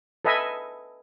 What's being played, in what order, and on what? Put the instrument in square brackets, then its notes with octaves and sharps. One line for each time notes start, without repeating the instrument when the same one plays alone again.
[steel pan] A4 B4 D#5 E5 G#5